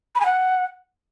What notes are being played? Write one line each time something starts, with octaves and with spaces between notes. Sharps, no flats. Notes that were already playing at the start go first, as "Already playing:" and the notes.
B5
G#5
F#5